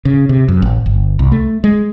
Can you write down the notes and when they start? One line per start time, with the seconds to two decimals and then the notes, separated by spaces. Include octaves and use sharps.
0.05 C#3
0.29 C3
0.48 F#2
0.62 A1
0.86 G1
1.19 C2
1.32 A3
1.64 G#3